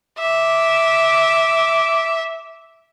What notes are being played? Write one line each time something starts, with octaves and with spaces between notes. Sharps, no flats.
E5 D6